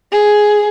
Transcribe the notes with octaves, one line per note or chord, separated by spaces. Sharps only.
G#4